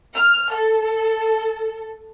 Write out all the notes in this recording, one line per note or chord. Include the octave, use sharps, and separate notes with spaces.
F6
A4